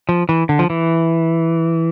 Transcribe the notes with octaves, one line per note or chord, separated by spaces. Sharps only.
F3
E3
D3
F3
E3